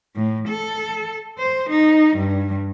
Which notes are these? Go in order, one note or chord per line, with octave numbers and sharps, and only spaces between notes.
A2
A4
C5
D#4
G2